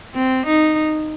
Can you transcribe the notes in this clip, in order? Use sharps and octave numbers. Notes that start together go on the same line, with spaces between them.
C4
D#4